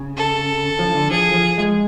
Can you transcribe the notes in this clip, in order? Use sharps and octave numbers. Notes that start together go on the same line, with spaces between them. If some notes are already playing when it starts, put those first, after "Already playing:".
Already playing: C#3
A4
F3
D3
F3 G#4
F3
G#3